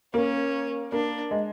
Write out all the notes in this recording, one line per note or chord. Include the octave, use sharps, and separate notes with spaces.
A#3 C#4
A#3 D4
G#3